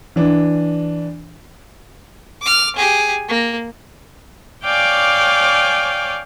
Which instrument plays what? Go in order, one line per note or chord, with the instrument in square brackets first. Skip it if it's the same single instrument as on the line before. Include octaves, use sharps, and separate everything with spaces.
[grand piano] E3 D4
[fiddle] D6 F6
G4 G#4
A#3
[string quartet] C#5 D5 F5 G5 G#5 D6